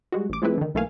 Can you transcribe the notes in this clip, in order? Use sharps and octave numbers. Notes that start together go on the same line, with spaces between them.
G3 G#3 F#4
A1 D6
F3 G#3 A3 C4 E4 B4
D3 D#3
B1 E3 A3 A#3 F5 G#5